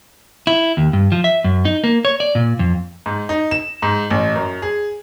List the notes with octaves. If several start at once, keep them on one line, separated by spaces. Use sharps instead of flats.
E4
D#2
G2
F3
E5
F#2
D#4
A#3
C#5
D5
A#2
F2
G#2
D#4
E7
G#2
A1
F#2
G#4